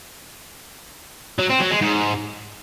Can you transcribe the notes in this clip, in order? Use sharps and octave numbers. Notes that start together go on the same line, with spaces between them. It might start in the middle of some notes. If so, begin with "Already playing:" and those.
F#3
C4
F#3
G#3
G#2